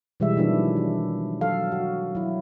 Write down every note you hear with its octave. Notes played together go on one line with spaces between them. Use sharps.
B2 E3 G3 G#3 E5
D#3 F3 F#3 B3 D4 E4
D4
F#3 A4 F5
F#4
F#3 E4